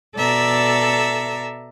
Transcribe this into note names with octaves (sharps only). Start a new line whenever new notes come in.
B2 A4 D5 E5 A#5